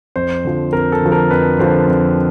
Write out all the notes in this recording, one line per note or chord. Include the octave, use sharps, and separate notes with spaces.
F2 C5
D3 F3
F2 A#4
A4
D3 F3
A#4
F2 B4
D3 F3 C5
F2